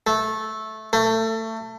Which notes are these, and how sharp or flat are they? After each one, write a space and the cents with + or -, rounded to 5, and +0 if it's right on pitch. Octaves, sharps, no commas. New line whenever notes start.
A3 -10
A3 +25